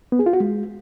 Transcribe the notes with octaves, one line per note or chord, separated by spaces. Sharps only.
B3
G#4
F4
F#4
G#3